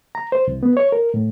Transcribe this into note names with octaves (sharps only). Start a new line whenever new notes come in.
A#5
C5
C2
B3
C#5
A#4
A2